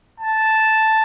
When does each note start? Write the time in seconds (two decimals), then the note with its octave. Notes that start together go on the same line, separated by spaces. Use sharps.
0.20 A5